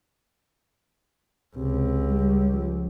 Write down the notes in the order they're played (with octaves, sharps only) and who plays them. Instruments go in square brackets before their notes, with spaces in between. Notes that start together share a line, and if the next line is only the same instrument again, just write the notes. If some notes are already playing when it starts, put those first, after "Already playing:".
[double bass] C#2 [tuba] C3
[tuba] G3
F3